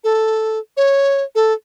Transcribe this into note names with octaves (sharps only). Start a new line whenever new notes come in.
A4
C#5
A4